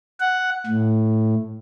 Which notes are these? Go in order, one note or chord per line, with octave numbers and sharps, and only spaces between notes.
F#5
A2